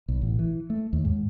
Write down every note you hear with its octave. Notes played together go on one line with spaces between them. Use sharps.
B1
A1
E3
A3
D#2
G#2